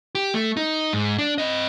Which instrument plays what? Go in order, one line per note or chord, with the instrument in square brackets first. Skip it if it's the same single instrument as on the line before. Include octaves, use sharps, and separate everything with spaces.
[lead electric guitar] G4
A3
D#4
G#2
D4
C4 D#5